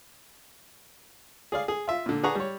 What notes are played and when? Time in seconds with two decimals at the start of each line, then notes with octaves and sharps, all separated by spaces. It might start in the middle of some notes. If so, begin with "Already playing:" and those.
1.52 G#4 D5 F5
1.68 G#4
1.88 F4 E5
2.06 A#2 D3
2.23 D4 G#4 B4 F#5 A#5 C#6
2.35 G3 C#5